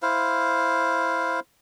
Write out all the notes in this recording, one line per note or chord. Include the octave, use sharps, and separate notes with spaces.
E4 C5 F5